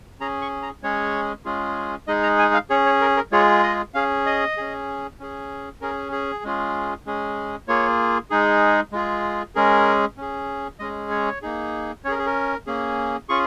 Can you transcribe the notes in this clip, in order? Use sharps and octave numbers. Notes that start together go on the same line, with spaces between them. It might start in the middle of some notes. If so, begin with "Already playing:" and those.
C#4 G#4 A#5
C#6
A#5
G#3 C#4 G#4 C#5
G#3 C#4 F4 G#4
G#3 D#4 G#4 D#5
A#5
G#5
F5
C#4 G#4 C#5
C#5
A#4
A#4
G#3 F4 G#4 C#5
D#5
C#4 G#4 F5
D#5
C#4 G#4
C#4 G#4
C#4 G#4 A#4
G#4
G#3 C#4 F4 G#4
G#3 C#4 G#4
A#3 F4 G#4 C#5
G#3 D#4 G#4
G#3 F4 G#4
G#3 C#4 G#4 A#4
C#4 G#4
G#3 C#4 G#4 D#5
C#5
A#3 D#4 G#4
C#4 G#4 C#5
A#4
G#4
A#4
A#3 C#4 G#4
C#4 F4 G#4 C#6